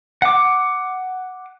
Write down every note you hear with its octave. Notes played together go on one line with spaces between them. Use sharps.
F#5 D6